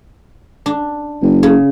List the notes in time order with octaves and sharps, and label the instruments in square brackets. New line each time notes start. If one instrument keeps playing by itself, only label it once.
[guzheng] D4
[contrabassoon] F#1
[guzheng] C#3